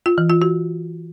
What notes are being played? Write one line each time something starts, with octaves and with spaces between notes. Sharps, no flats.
F4
E3
F4
F#4